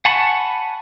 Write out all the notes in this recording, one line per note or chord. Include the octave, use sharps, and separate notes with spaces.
F#5 G#5 A5 B5 C#6